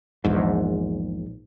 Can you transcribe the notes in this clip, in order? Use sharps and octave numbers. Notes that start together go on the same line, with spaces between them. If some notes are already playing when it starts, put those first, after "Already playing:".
A#1 E2 G#2